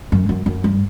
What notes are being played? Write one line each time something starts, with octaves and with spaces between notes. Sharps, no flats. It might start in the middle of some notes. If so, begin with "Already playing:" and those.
F#2
F#2
F#2
G2